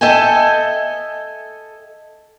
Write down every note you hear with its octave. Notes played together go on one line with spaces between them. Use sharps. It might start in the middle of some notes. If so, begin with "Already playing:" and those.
A4 D#5 E5 G5 G#5